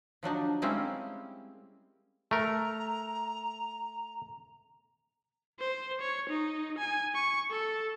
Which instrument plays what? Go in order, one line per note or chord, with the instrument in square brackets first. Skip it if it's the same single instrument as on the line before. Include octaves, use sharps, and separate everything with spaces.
[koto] F3 F#3 D4 D#4
G3 G#3 A#3 C4 C#4 E4
[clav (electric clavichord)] A3 A#4 [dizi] A#5
[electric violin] C5
C#5
D#4
G#5
C#6
A4